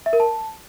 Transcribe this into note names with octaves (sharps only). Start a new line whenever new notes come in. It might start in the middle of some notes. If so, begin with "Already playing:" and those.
E5
A#4
A5